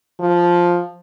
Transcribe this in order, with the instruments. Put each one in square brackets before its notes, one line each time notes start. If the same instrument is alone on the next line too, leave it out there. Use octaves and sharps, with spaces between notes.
[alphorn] F3